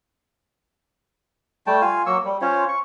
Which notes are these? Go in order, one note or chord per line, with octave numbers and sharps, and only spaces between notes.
G3 A3 G5 A5
F4 F5 G#5
F#3 A#3 C#6 E6
G3
C#4 F4 C5 C#5
C#6